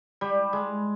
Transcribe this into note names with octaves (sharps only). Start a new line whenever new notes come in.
G3
G#3